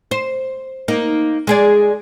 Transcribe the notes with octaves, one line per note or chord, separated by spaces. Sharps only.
C5
A#3 D#4
G#3 G#4 D5